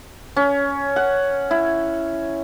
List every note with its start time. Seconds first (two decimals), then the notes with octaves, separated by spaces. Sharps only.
0.36 C#4
0.96 F#5
1.51 E4